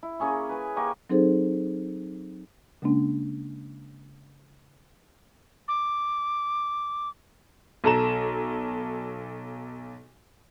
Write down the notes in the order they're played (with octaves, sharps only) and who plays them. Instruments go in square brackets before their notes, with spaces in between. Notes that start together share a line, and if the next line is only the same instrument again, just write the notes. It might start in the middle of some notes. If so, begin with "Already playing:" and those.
[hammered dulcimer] E4
A#3 C#4 G#4 C#6
B4 G#5
A#3 G4 G#5 C#6
[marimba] F#3 C4 D#4 G#4 A4 C5
C#3 G#3 A#3 C#4 D4
[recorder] D6
[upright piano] B1 A4 A#5 E7